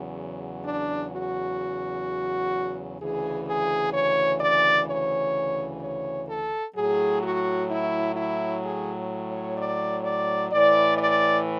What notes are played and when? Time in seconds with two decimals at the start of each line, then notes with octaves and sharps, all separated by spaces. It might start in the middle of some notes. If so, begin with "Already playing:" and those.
Already playing: E2 C#3 F#3
0.65 D4
1.13 F#4
3.00 D2 C#3 E3 G#4
3.47 G#4
3.94 C#5
4.41 D5
4.87 C#5
5.81 C#5
6.28 A4
6.76 A2 F#3 G#4
7.23 F#4
7.69 E4
8.16 E4
8.64 G#4
9.27 C#5
9.57 D5
10.04 D5
10.51 A2 E3 D5
10.98 D5